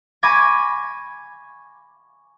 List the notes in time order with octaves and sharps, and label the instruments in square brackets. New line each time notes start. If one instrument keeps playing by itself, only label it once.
[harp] G#5 B5 C#6 D6 G#6 A#6